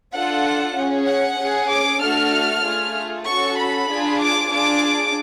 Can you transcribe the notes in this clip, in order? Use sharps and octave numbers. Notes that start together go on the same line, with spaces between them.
D4 F4 A4 F#5
C#4 G#4
F#5
C#4 G#4
D6
A3 D4 F#4 A4 F6
A3 F4 G#4
C#4 F#4 A4 C#6
B5
D4 F4 G#4
D6
D4 F4 G#4 D6